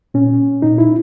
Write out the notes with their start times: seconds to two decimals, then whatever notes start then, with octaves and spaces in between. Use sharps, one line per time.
0.14 A#2 C#4
0.62 A#2 D#4
0.78 E4